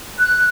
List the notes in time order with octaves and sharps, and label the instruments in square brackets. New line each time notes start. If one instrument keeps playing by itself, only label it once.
[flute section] F#6